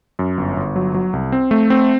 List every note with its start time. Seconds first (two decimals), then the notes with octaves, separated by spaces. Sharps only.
0.19 F#2
0.38 G1
0.57 G1
0.76 F#3
0.94 F#3
1.13 C2
1.32 C4
1.51 A3
1.70 C4